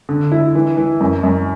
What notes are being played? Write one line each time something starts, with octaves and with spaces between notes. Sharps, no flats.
D3
E4
E3
E3
F#2
F#2